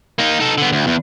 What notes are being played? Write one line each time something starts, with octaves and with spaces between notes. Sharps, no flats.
A#3 D#4
D#4 A4
D3 B3
D2
E2